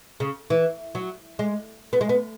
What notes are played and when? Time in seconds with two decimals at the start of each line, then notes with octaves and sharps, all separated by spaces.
0.20 C#3
0.50 E3
0.95 F#3
1.39 G#3
1.93 B3
2.01 G#3
2.09 B3